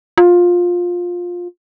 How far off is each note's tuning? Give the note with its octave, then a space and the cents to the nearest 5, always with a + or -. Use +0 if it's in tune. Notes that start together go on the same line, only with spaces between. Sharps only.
F4 +15